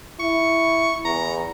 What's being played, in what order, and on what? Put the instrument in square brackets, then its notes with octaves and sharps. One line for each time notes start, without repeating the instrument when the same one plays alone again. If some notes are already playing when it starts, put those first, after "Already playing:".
[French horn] E4 [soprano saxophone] C#6
[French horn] E2 [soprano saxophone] A#5